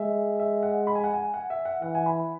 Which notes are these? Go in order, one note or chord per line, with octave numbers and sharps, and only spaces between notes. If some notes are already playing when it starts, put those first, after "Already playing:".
Already playing: G#3 E5
E5
F#5
B5
G#5
F#5
G#5
F#5
E5
F#5
E3 F#5
G#5
B5